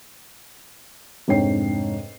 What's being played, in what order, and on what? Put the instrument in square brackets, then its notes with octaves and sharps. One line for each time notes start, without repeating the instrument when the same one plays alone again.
[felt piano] F1 G#2 D4 C#5 G5 C7